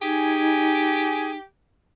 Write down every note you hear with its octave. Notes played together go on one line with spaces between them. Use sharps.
D#4 G4 G#4 G#5